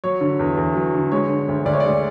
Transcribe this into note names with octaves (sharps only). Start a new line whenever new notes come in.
F#3 C#5
D3
E2
E2
F#3
D3
G#3 C#5
D3
D2
D2 D5
C#5
G#3 D5